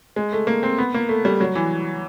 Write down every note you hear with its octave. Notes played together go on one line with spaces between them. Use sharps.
G#3
A3
A#3
C4
B3
A#3
A3
G3
F#3
E3